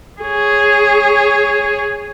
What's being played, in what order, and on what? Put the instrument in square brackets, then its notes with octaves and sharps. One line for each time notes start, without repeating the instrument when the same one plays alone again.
[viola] G#4 C#5